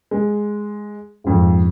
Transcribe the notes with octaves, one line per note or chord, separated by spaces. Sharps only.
G#3
F2 G#2